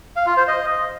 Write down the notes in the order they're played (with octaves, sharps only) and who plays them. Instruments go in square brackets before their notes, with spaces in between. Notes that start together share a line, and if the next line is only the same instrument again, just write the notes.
[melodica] F5
F4
C5
D#5